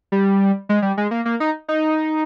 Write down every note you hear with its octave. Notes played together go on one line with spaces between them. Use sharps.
G3
G#3
G3
G#3
A#3
A#3
D#4
D#4